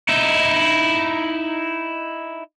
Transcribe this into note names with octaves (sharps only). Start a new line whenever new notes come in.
D#4 E4